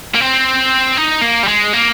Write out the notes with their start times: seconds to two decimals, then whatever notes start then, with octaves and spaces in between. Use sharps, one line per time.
0.15 A#3
0.21 C4
0.97 D#4
1.22 A#3
1.43 G3
1.48 G#3
1.73 A#3